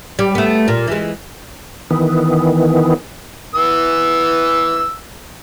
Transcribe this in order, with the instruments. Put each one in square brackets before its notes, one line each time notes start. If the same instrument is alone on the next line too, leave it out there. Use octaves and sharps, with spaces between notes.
[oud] G3
A3 B3
A#2
E3 G#3
[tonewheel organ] D#3 E3 B3
[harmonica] E3 B3 E6